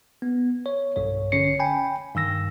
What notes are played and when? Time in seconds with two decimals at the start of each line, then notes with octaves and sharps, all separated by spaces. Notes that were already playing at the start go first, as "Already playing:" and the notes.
0.22 B3
0.66 C#5
0.96 B1 G2 C#5
1.32 A#1 D3 C#4 C#5 C7 C#7
1.59 G5 G#5 B5
2.15 G2 D#3 E6 A#6